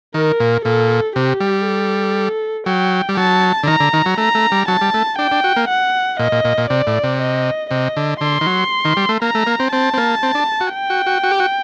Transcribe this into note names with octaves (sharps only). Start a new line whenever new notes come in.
D#3 A#4
A#2
A#2 A4
C3 G4
G3
A4
F#3 G5
G3
F#3 A5
D3
D#3 A#5
D3
D#3
F#3
A3 A#5
A3
G3
F#3 A5
G3
A3
D4 G5
D4
F#4
A#3
F#5
A#2 D#5
A#2
A#2
A#2
C3 D5
A2
C3
D#5
C3 D#5
D3
D3 C6
D#3
F#3
D#3
G3
A3
A#3 A#5
A3
A#3
C4
C4 A5
C4
A#3
C4
D4
F#4
G5
F#4
F#4
F#4
G4
F#4